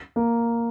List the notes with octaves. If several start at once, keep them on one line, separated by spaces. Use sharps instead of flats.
A#3